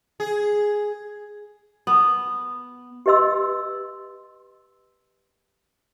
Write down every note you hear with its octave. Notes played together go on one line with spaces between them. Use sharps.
G#4
B3
G4 B4 D#5 C6 E6